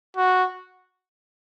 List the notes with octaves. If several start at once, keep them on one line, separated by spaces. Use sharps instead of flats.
F#4